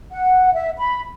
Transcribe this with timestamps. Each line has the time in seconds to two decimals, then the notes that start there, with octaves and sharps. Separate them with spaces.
0.11 F#5
0.53 E5
0.78 B5